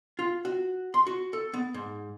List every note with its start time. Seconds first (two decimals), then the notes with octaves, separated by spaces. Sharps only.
0.19 F4
0.45 F#4
0.94 C6
1.07 F#4
1.33 A4
1.54 B3
1.74 G#2